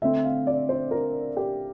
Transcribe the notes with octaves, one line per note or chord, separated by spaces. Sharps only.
D3 A3 C4 E5
F5
D5
C5
A#4
G4